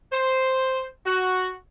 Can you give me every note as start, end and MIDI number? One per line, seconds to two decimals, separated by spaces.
0.12 0.86 72
1.05 1.52 66